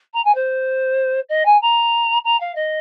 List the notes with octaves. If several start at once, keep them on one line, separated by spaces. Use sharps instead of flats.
A#5
G#5
C5
D#5
G#5
A#5
A#5
F5
D#5